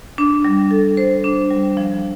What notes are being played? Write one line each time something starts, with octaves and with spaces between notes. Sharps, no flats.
D4
G3
A4
C5
D4
G3
F3